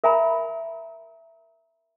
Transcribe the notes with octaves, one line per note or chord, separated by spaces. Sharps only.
A#4 E5 G#5 A#5 B5